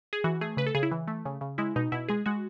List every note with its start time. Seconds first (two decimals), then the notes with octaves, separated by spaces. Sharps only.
0.13 G#4
0.24 E3 F#4
0.41 A3 G#4
0.57 C#3 B4
0.66 A4
0.75 C#3 G#4
0.83 E4
0.91 E3
1.08 A3
1.25 C#3
1.41 C#3
1.58 G#3 E4
1.76 B2 D#4
1.92 B2 E4
2.08 G#3 G#4
2.26 G#3 F#4